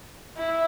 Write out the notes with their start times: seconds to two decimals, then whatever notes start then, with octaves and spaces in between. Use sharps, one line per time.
0.37 E4